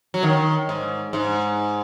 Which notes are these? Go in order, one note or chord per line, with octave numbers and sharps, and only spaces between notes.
F#3
D#3
G#2
G#2